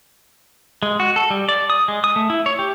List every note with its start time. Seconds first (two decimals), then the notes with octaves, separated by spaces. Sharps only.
0.82 G#3
1.00 F#4
1.16 A4
1.30 G3
1.49 D5
1.70 D#6
1.88 G#3
2.04 D#6
2.16 A3
2.30 E4
2.46 C#5
2.59 G4